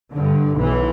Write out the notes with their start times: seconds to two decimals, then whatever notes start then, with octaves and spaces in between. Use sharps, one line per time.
0.14 G2 D3
0.56 B1 E3